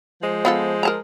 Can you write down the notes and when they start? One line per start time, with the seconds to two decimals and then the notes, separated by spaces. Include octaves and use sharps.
0.22 F3 G#3 C5
0.45 B3 F4 A4
0.83 A#4 A5 A#5